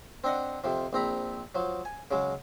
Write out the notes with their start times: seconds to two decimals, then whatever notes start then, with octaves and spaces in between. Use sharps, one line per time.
0.24 C4 D4 D#5 F#5
0.64 F2 C3 F3
0.93 A#1 C4 A#5 B5
1.55 F3 F#3
1.85 G#5
2.11 C#3 F#3 G#3